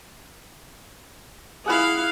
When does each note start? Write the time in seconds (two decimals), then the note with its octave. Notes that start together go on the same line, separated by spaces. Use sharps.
1.66 E4 G#4 F5 F#5 B5